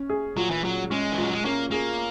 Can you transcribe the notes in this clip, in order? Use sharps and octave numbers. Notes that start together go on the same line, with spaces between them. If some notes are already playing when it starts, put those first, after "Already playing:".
Already playing: C#4
G#4
A#2 F#3
E3
A#2 F#3
G#3 C#4
E3
A#2 F#3
G#3
A#3 C#4
A#3 G#4